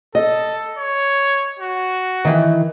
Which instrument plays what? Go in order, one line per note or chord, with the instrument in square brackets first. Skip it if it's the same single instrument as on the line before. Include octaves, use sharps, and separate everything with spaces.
[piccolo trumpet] A4 [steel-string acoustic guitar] D#5
[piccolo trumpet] C#5
F#4
[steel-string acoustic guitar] D#3 E3